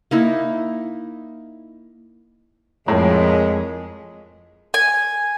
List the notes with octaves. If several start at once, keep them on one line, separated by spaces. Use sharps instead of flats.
A#3 D#4 E4
F2 A2 G#3 A#4 C#5
G#5